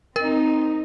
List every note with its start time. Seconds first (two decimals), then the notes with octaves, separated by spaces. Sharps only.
0.16 C4 D#4 A#4